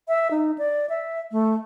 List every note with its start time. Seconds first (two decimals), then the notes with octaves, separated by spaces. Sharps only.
0.08 E5
0.31 D#4
0.58 D5
0.90 E5
1.32 A3